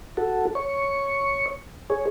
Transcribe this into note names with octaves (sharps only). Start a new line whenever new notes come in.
F#4 A4
C#5 C#6
G#4 C#5